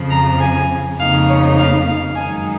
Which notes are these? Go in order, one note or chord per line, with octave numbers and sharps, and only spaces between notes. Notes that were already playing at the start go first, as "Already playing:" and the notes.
Already playing: F2 C#3 F3
A#5
G#5
F2 C#3 F3 A#3 D#4 F5
C#5
F5
F5
F#2 D#3 G#3 D#4 G#5